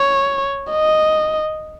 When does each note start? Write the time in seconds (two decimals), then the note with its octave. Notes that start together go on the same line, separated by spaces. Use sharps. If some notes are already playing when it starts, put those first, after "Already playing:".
Already playing: C#5
0.72 D#5